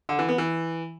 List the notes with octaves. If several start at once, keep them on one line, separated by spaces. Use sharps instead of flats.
D3
E3
B3
E3